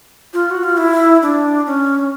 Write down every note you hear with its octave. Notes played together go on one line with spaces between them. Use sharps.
F4
F#4
F4
E4
D4
C#4